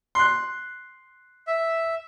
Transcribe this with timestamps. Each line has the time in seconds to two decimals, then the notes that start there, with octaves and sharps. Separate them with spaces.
0.15 C6 F#6
1.47 E5